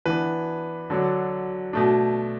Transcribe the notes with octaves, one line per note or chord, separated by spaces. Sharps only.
E3 B3 D4 B4
D3 F#3 D4
B2 A3 D4